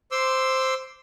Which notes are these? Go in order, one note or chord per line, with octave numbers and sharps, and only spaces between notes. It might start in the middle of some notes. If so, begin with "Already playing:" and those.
C5 C6 D6 E6